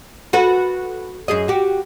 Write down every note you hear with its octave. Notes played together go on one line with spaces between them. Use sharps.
F#4 A4 B4
F#2 G#4 D#5
F#4 G4